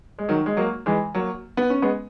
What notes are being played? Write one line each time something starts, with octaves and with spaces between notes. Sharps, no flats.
G#3
D#3 F#3
G#3
F#3 A#3
E3 G#3
F#3 A#3
B3
C#4
G#3 B3